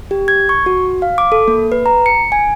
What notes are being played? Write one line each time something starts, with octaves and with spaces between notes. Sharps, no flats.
G4
G#6
C#6
F#4
F5
D6
A4
A#3
B4
A#5
C#7
G#5